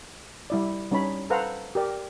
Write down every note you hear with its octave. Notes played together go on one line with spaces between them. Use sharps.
G3 E4 D5
G3 C#4 D#4 C#5 B5
A4 B4 C5 F5 F#5 A#5
G4 A#4 D5